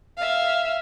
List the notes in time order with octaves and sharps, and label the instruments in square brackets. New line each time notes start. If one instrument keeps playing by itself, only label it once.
[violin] E5 F5